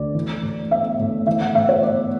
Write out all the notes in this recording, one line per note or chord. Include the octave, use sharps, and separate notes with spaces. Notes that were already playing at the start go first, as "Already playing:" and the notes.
Already playing: D2 D5
E3
A2
B3 E5
A2
E3 E5
F#5
A2 E5
C#5
B3 D5